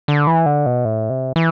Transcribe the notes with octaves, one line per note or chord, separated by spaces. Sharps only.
D3
E3
D3
B2
A2
C3
E3